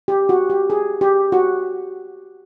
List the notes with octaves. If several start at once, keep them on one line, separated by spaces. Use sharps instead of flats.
G4
F#4
G4
G#4
G4
F#4